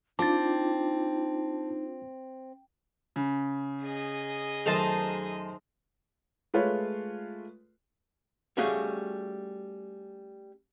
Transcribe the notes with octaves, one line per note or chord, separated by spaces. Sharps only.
C4 D4 D#4 F4 A5 D6 A6
C#3
G#4 D#5
F#2 D#3 A3 D#4 C5 A5
G#3 A3 F4 B4 C#5
G3 A3 C#4 F#4 G#4 F5